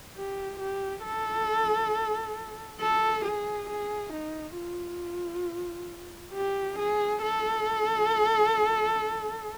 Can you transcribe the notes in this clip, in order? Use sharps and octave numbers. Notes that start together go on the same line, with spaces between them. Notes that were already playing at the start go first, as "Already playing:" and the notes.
G4
G4
A4
A4
G#4
G#4
D#4
F4
G4
G#4
A4